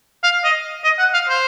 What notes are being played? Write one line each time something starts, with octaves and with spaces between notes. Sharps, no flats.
F5
D#5
D#5
F#5
F5
C5